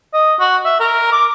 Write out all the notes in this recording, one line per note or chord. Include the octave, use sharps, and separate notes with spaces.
D#5
F#4
E5
A#4
D6